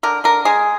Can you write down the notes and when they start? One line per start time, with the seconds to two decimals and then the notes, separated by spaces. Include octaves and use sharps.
0.03 D3 A#4
0.24 D3 A#4
0.45 G#3 G#4